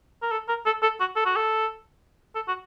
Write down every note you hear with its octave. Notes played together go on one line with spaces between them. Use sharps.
A#4
A4
A#4
A4
A4
F#4
A4
F#4
A4
A4
F#4